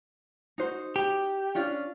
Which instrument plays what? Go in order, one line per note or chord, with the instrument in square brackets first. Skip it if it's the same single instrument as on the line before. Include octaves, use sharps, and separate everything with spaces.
[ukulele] D#4 F#4 C5
[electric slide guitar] G4
[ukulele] C#4 D4 F4